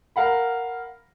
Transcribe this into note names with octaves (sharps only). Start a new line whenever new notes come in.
A#4 F5 F#5 B5